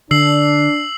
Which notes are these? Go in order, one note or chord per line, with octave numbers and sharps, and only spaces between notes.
D3 D4 E6 C7 F#7